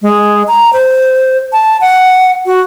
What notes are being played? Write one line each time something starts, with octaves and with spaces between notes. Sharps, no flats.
G#3
A#5
C5
A5
F#5
F#4